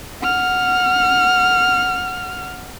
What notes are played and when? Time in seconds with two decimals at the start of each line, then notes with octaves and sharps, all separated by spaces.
0.22 F#5 F6